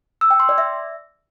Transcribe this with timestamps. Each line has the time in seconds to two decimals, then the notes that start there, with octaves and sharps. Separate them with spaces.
0.21 E6
0.31 G5
0.40 C6
0.49 D5
0.58 E5